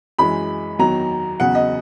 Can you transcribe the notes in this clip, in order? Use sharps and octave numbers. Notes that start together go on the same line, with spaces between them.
F#2 E3 G#3 B5
E2 D#3 F#3 A#5
E2 C#3 F#3 F#5
D#5